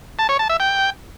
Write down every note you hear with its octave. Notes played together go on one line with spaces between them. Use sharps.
A5
C#5
A5
E5
G5